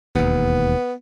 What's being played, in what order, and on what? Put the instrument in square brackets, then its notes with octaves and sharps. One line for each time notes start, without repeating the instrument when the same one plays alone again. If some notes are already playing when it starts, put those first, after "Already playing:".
[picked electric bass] E1 D#2 [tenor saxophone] B3